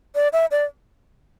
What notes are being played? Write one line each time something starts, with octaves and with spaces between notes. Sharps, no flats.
D5
E5
D5